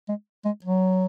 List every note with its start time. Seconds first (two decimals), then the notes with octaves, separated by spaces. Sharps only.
0.08 G#3
0.45 G#3
0.64 F#3